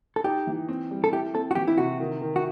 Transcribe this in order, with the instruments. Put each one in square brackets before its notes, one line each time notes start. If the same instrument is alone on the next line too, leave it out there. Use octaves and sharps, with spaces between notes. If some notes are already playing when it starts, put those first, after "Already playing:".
[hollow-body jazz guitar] A4
[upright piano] D#4 [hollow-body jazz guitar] G4
[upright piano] E3
C4
G3
[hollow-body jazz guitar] A4
[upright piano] E4 [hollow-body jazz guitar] G4
[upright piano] C4 [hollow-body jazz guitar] A4
[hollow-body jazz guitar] F#4
[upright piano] E3 [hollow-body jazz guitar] G4
[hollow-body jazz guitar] E4
[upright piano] C3 [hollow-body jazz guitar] F#4
[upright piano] D#3
D#3
[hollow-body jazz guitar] F#4